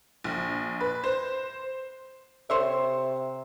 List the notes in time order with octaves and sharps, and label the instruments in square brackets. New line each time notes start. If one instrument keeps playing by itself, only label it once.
[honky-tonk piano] A#1
B4
C5
[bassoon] C3 [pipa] C5 C#5 E5